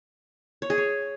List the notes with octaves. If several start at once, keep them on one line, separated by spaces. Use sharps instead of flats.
C#5
G#4
C#5